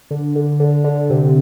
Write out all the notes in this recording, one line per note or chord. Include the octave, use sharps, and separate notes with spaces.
D3
D3
D3
D3
C3